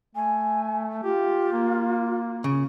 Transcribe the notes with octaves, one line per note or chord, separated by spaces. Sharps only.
A3 G#5
F4 G4
A#3
C#3